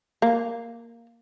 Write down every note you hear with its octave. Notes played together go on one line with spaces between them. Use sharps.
A#3